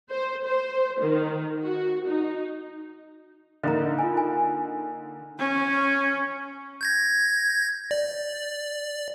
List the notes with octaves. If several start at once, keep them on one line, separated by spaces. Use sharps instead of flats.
C5
C5
D#3
F#4
D#4
D3 A#3 D#4 D#5 A#5
F4 G#5
G#5
C#4
G6 G#6 A#6
D5